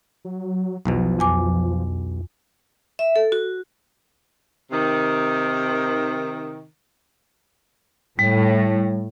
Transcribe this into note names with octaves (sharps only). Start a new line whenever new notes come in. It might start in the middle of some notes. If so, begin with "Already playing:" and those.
F#3
B1 E2 B2 F3
F2 G#5 D6
E5
A4
F#4
C3 D#3
A2 G3